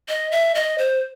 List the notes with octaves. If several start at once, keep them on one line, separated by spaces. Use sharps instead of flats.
D#5
E5
D#5
C5